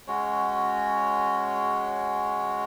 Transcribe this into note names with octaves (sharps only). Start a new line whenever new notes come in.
G#3 C#4 F#4 C#5